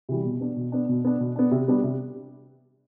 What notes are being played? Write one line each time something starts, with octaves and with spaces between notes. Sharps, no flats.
C3 E3 G3
B2
B3 D4
B2
B3 D4
B2
B3 D4
B2
B3 D4
C3
G3 B3 D4
C3